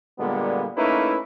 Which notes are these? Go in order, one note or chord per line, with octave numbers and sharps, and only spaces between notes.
A#2 D3 G3 G#3 A#3 B3
A3 A#3 C#4 D#4 E4 B4